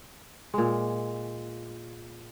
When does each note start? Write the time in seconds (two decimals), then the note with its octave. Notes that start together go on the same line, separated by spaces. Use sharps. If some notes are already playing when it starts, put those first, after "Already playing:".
0.54 A#2 G#3